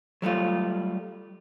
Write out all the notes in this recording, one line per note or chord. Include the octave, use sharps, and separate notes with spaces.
F#3 G3 A3 F4